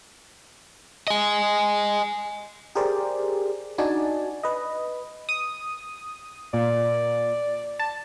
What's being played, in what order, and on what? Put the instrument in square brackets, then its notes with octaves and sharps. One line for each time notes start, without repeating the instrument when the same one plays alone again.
[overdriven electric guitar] D#5 G#5
[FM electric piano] G4 G#4 A#4 C5 D5
D4 D#4 F#4 D5 G#5 A5
B4 D#5
[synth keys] D#6
[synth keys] A#2 [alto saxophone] D5
[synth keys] A5